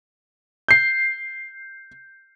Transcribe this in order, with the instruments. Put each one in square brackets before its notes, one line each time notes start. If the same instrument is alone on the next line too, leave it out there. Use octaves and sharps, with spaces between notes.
[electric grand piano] G6 C7